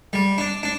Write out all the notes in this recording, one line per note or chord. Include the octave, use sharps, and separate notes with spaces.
G3
D4
D4